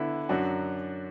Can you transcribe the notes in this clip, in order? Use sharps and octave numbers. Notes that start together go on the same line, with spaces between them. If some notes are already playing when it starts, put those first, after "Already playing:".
Already playing: D3 B3 E4
F#2 F#3 D4 F#4